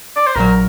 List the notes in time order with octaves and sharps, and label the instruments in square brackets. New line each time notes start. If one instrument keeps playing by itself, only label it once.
[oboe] D5
C5
[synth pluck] A#1 A#2 F#3 [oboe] A#4